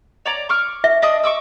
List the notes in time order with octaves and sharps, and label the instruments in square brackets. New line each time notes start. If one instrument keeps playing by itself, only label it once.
[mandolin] C#5 D5 A#5
C#6 D6 F6
[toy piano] E5
[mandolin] D4 D#5 D#6
C#6 D6 E6